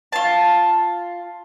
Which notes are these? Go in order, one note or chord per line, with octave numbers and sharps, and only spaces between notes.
F4 A5